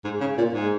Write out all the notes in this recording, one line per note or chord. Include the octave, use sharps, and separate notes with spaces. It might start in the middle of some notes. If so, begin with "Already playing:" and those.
G#2
C#3
A#2
G#2